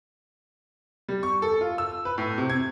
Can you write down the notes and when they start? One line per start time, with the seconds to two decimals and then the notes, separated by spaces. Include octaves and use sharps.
1.09 G3
1.23 C#6
1.42 A4
1.61 F4
1.78 E6
2.05 B4
2.18 A2
2.38 C3
2.50 G#6